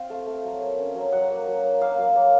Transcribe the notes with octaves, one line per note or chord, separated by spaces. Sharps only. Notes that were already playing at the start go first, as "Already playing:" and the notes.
Already playing: C4 F4 F5
A3
A3
F#3
A#3
C#4
F#3
F#3 F#5
A#3
F#3
A#3
A#3 F5
F#3
A#3